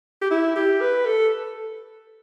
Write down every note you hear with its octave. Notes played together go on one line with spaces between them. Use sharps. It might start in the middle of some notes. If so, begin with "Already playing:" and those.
G4
E4
G4
B4
A4